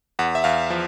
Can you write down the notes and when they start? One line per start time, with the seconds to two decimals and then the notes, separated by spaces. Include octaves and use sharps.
0.19 E2 F#5
0.35 E5
0.44 E2 F5
0.70 F3